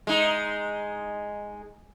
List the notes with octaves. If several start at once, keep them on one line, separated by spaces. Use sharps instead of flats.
G#3 D#4